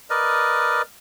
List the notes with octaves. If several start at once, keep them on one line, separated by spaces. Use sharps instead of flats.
A#4 B4 D5 D#5